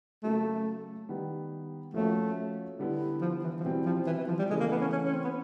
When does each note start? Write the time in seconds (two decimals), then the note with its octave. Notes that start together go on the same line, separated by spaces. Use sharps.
0.23 C#3 F#3 A3 A#3
1.09 D#3 G3 B3
1.94 F3 A3 A#3 C#4 F#4
2.79 D3 G3 B3 E4
3.21 F3
3.43 E3
3.60 F3
3.64 B2 E3 G3 C4 E4
3.85 F3
4.07 E3
4.18 E3
4.28 F3
4.39 G3
4.50 C#3 E3 G#3 A3
4.60 A#3
4.71 B3
4.82 C#4
4.92 C#4
5.04 C#4
5.14 C4
5.24 B3